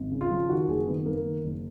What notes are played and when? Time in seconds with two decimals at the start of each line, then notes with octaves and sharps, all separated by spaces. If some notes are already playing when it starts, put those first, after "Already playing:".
Already playing: G#1
0.11 C#3
0.21 F4
0.31 F3
0.49 D#3 F#4
0.68 F#1 G#4
0.87 D#3 B3
1.06 F#1 A#3
1.25 D#3
1.44 F#1